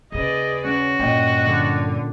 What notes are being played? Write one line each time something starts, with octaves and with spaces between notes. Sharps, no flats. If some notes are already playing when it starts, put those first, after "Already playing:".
D#2 C#3 G#4 B4 D5 D#5
C#4 F#4
G2 A#2 D#5 G5
D3 D#6